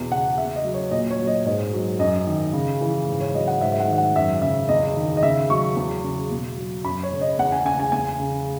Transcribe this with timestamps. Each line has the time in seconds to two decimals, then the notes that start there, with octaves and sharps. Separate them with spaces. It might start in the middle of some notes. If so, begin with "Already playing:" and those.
Already playing: E2 B2
0.11 C#3 F#5
0.38 C#3 E5
0.56 D#5
0.64 F#3
0.74 C#5
0.91 A#2 D#5
1.10 C#5
1.19 F#3
1.27 D#5
1.45 G#2 D#5
1.73 F#3
1.99 F#2 D#5
2.27 D#3
2.53 C#3
2.81 E3
3.07 G#2
3.20 C#5
3.34 F#3 D#5
3.47 F#5
3.61 G#2 E5
3.72 E5
3.80 F#5
3.88 D#3 E5
3.98 F#5
4.15 F#2 E5
4.42 C#3 E5
4.69 E2 D#5
4.97 D#3
5.17 D#5
5.23 C#3 E5
5.50 F#3 C#6
5.76 E2
6.04 C#3
6.31 B2
6.57 F#3
6.84 F#2 B5
7.03 C#5
7.12 C#3
7.21 D#5
7.39 E2 F#5
7.52 G#5
7.65 C#3 G#5
7.80 G#5
7.92 E2 G#5
8.20 C#3